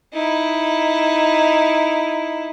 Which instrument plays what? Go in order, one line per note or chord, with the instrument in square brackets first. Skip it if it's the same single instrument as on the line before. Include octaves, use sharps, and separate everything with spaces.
[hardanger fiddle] D#4 E4